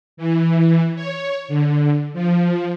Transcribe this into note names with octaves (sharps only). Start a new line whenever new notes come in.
E3
C#5
D3
F3